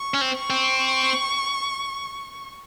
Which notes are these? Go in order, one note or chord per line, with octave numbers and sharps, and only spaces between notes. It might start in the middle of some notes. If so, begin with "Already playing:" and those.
Already playing: C#6
C#4
C4
C#6
C4